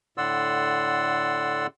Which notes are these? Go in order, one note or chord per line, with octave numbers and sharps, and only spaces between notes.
A2 D3 D5 F#5 C6 E6